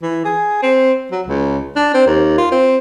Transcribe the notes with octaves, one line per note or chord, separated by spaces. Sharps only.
E3
G#4
C4
F#3
C#2
D4
C4
D#2
F4
C4